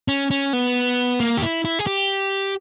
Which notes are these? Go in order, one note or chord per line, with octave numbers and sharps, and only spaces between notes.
C#4
C#4
B3
A#3
G4
E4
E4
G#4
G4